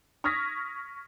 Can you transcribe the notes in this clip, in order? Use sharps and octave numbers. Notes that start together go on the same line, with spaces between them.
C#6 D#6 F6 G#6 A#6 B6